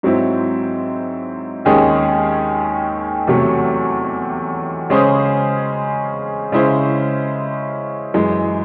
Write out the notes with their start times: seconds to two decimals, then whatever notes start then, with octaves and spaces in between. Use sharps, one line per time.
0.03 G#2 F#3 C4 E4
1.65 D#2 D#3 G#3 C#4 G#4
3.27 E2 C3 F#3 A3
4.90 C#3 G#3 C#4 G#4 C5
6.52 C#3 G#3 C#4 E4 C5
8.14 F#2 E3 G#3